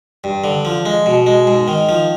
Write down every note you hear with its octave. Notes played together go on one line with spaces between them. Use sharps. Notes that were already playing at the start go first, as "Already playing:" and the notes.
G2
D3
F3
G#3
B2
G#3
G#2
D#3
F3